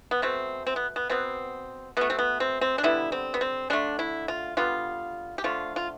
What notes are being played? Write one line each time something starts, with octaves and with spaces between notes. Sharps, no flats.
B3
B2 A3 C4
C4
B3
B3
B2 B3 C4
B2 A3 B3
C4
B3
C4
C4
D4
D3 G3 B3 E4
C4
B3
C4
D3 A3 D4
E4
F4
D3 G3 B3 F4
G4
D3 F3 A3 F4
F4